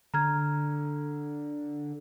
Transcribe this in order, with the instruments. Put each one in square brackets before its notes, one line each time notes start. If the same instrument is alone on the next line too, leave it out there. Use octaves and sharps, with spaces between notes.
[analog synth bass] D3 [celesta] A#5 F6 G#6